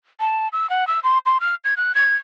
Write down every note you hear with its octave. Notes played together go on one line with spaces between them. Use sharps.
A5
E6
F#5
E6
C6
C6
F6
G#6
F#6
G#6